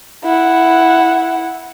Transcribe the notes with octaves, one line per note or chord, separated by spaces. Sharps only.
E4 F#5